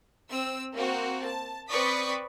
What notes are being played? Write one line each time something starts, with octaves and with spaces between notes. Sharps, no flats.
C4 E6
A#3 C4 F#4
A5
C4 B4 D5 C#6 D#6 B6